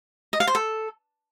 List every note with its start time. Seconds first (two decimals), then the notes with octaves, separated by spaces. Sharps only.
0.33 D#5
0.40 F5
0.47 C5
0.55 A4